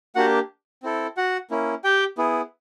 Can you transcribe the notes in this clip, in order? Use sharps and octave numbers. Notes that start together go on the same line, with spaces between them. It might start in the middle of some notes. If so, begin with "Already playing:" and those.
A#3 D4 F#4 G4 F#5
C4 E4 A4
F#4 F#5
A#3 C#4 E4
G4 G5
B3 E4 G#4